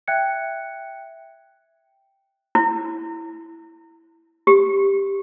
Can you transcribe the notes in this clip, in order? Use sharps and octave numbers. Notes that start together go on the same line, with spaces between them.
E5 G5 F#6 G#6 C#7
E4
G4